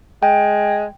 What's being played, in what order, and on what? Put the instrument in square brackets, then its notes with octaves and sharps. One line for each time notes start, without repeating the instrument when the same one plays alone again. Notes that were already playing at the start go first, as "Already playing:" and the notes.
[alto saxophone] G#3 [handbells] G5